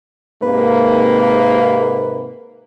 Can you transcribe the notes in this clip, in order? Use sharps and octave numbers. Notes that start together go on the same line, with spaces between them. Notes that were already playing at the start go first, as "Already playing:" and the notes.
G#2 C3 A#3 B4